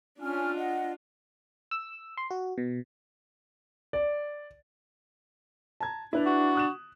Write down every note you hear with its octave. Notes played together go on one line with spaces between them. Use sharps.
C#4 D4 F4 G#5 F6
D#5 F#5
E6
C6
F#4
B2
D5
A5 A#5 G#6
D4 E4 B4 F7
F#4
D#6 F#6 E7